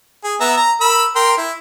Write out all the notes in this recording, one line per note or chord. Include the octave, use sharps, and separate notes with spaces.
G#4
B3 E5 A#5
A#5
A#4 B5 E6
A#4 G5 C6
E4